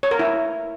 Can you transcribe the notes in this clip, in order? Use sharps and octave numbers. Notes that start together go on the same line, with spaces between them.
C#5
A#4
E4